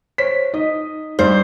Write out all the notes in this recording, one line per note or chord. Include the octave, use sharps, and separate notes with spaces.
C5 C#5 B6
D#4 D#5 D#6
G2 D#4 C5